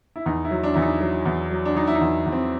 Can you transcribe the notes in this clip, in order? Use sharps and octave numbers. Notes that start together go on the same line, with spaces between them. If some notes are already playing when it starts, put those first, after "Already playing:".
E4
E2 D#4
E4
F#3
D4
E2 E4
D#4
F#3
E2
F#3
D4
F#3 D#4
E4
D#4
E2
E2
C4